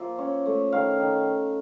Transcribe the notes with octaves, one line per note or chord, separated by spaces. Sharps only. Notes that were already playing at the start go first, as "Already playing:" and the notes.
Already playing: F3 A#3 E5
C#4
A3
D#3 F5
D#3